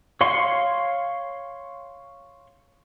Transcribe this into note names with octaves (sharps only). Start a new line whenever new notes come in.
C#5 F5 C6 C#6